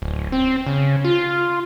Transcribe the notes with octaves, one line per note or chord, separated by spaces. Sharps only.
D1
C4
C#3
F4